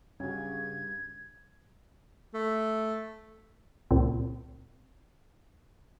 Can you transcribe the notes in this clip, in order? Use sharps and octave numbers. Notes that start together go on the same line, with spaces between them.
G2 C#3 C#4 F#4 G#6
A3
C#2 A#2 C4